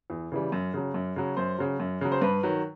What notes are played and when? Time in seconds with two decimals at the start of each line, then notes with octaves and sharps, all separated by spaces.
0.10 E2
0.32 C#3 E3 G3
0.52 F#2
0.74 C#3 F#3
0.94 F#2
1.16 C#3 F#3
1.37 F#2 C5
1.58 C#3 F#3
1.80 F#2
2.01 C#3 F#3
2.12 C5
2.22 G2 B4
2.43 D#3 F#3